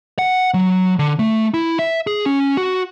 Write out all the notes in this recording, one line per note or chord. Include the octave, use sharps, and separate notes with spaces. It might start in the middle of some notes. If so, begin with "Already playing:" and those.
F#5
F#3
D3
A3
E4
E5
G#4
C#4
F#4